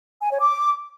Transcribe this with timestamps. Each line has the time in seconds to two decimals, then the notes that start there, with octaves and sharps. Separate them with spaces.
0.21 G#5
0.31 C#5
0.40 D6